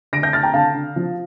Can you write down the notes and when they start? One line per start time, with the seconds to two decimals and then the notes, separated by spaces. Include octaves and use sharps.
0.13 D3 A#6 D7
0.23 G6 A#6
0.33 D3 F6 A6
0.43 G5 A#5
0.54 D3 F5 A5
0.75 D3
0.96 F3